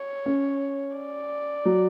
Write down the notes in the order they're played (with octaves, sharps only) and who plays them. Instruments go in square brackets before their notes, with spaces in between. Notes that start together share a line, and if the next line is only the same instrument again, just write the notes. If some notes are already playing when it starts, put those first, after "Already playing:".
Already playing: [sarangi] C#5
[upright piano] C#4
[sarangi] D5
[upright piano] F#3